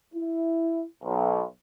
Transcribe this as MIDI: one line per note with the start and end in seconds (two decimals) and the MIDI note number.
0.14 0.84 64
1.03 1.42 35